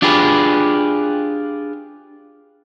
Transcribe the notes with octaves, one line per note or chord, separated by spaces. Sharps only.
D4 F4 G4 G#4 B4